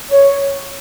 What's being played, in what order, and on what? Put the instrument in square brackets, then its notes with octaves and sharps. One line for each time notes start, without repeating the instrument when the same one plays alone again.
[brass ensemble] C#5